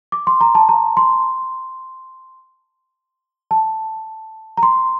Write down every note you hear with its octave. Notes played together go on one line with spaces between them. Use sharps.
D6
C6
A#5
A5
A#5
C6
A5
A#5
C6